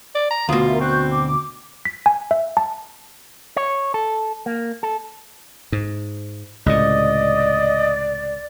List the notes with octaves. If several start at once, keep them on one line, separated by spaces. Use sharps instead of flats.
D5
A#5
D2 B2 F4 D#6
A#4 E5
C4 C#6 F#6 G6
D6
B6
G#5
E5
A5
C#5
A4
A#3
A4
G#2
C#2 A2 C3 D5 D#5